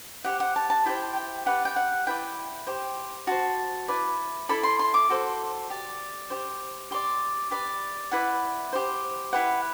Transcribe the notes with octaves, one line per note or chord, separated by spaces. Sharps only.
G4 C5 F#5
F#5
A5
A5
E4 G4 C5 G5
G5
G4 B4 D5 F#5
G5
F#5
E4 B4 D5 G5
G4 C5
F#4 C5 A5
E4 B4 D5
E4 A4 D5 B5
C6
C6
D6
F#4 A4 C5
G4 D5
G4 C5
G4 D5 C6
G4 B4 D5
E4 B4 D5 F#5
G4 C5
E4 G4 B4 F#5